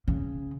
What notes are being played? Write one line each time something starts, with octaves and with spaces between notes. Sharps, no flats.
C#3